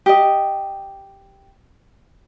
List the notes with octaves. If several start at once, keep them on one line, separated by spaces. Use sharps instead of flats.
G4 D#5